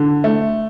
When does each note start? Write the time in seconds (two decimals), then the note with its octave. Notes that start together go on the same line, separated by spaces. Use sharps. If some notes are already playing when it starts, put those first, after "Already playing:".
Already playing: D3
0.24 A3